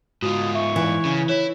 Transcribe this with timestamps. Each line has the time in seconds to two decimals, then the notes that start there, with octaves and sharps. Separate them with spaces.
0.22 G#2 F4 F#4 D#6
0.55 E5 C#6
0.76 E3
1.05 C#3
1.29 E4 C#5